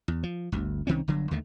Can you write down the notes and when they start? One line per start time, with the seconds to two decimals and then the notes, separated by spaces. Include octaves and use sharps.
0.08 E2
0.23 F3
0.52 G1 D2
0.87 C2 D#3 C4 C#4
1.08 G1 D3 F#3
1.31 D#2 D3 D#3 A3